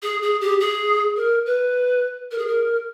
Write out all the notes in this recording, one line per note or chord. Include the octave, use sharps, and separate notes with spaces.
G#4
G#4
G4
G#4
A#4
B4
A#4
G#4
A#4